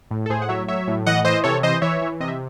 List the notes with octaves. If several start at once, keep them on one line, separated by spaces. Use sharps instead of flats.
A2
A4
A2 G#4 C5
F#5
F#3 C#5 E5
F#3 C#5 E5
A2
E3 D#5 F#5
E3 C5 D#5
C3 A4 C#5
E3 C5 D#5
E3 C#5 E5
E3
C3 D#5
E5